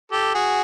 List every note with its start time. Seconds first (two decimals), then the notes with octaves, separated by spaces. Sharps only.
0.12 G4 A4
0.35 F#4 G#4